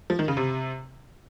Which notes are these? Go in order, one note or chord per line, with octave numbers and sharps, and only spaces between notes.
F3
D#3
C#3
C3